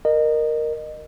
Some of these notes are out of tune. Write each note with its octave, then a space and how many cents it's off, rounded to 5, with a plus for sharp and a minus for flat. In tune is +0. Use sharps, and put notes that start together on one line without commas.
A#4 +0 D#5 -25